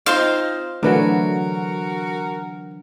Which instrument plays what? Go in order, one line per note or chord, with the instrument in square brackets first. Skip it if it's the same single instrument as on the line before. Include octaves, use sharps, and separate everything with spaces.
[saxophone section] C4 D#4 [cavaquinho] F4 C5 F5
[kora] D3 E3 F#3 [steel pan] A3 D4 B4 [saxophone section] F#4 A#4